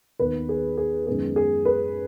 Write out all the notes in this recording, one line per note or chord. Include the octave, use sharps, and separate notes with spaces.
D#2 D#3 B3 B4
G#4
G#4
F#2 D#3 G#3 B3 G#4
G#4
B4